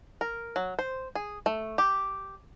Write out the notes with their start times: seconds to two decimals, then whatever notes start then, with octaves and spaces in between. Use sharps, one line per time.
0.21 A#4
0.56 F#3
0.79 C5
1.15 G#4
1.46 A3
1.78 G4